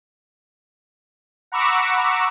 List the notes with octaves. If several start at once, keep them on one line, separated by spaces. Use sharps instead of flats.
F#5 A#5 B5 C#6 D6 E6